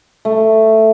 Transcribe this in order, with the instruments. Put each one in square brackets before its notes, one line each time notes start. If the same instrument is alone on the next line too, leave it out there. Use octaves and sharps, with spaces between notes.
[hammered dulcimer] A3